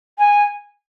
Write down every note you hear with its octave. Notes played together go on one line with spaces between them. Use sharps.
G#5